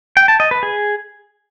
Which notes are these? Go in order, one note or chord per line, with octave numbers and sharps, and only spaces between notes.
G5
A5
D#5
B4
G#4